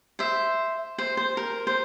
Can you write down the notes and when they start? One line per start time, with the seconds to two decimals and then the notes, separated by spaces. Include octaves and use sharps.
0.19 C5 E5
0.98 C5
1.17 C5
1.37 A#4
1.67 C5